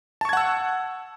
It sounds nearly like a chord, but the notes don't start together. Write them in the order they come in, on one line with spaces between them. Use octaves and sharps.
A5 C#6 G#6 F#5 E6